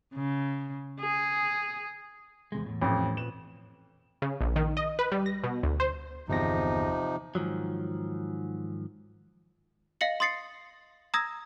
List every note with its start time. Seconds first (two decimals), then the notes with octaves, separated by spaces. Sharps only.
0.15 C#3
1.00 G#4
2.52 E2 C3 G#3
2.66 E2 A2
2.82 A1 F2
3.17 A#2 B4 E7
4.22 C#3
4.41 A#1
4.56 D#3
4.77 D#5
4.99 B4
5.12 G3
5.26 A#6
5.44 B2
5.63 D2
5.80 C5
6.28 G1 E2 C3 F3 D#4 A#6
7.35 G#2 D#3 F3 F#3
10.01 D#5 F5 A#6 C#7 F#7
10.20 C6 D#6 A6 C7 C#7
11.14 A#5 D#6 E6 G#6 A#6